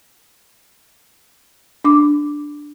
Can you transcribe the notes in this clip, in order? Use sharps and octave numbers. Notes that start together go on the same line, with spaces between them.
D4 D6